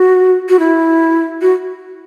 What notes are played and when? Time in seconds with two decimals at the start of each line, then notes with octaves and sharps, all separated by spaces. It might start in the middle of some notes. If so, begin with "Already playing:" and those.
Already playing: F#4
0.49 F#4
0.59 E4
1.41 F#4